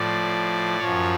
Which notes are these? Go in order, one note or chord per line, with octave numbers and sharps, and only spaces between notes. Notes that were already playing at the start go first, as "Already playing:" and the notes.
Already playing: A2 F3 D5
F#2 F3 C#5